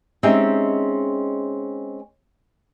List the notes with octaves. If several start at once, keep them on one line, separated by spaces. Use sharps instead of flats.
G#3 C4 C#4 D#4 G4 E5